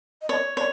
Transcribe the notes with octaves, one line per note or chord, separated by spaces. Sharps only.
D#5
C#5 D5
C#5 D5